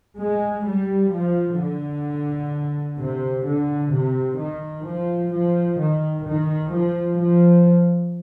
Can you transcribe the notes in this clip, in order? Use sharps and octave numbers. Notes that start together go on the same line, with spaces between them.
G#3
G3
F3
D3
C3
D3
C3
D#3
F3
F3
D#3
D#3
F3
F3